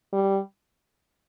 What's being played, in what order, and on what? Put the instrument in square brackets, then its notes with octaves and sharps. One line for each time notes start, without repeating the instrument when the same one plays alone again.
[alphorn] G3